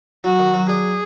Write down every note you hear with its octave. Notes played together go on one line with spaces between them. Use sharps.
F#3 F#4
D#3
F#3
D4 G#4